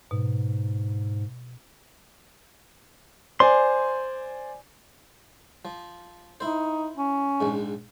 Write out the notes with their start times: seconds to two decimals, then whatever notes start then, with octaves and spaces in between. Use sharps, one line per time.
0.11 G#2 B2
3.40 C5 D5 G#5 C6
5.65 F3
6.40 D#4 E4 C5
6.97 C#4
7.41 A#1 G#2